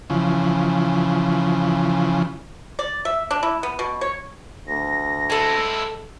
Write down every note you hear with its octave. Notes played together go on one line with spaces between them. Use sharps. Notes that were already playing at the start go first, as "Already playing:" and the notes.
C#3 E3 F3
D5
E5
D4
E4
B3
B2
C#5
D2 A#6
G#3 E4 A4 A5